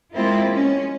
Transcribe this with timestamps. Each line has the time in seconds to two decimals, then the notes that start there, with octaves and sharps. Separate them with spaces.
0.14 G#3 A#3 C4 E4 F4
0.49 G#3 C#4